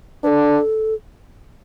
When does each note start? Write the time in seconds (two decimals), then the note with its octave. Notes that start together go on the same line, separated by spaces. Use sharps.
0.23 D4 A4 B4